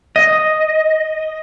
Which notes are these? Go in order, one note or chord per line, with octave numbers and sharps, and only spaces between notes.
D#5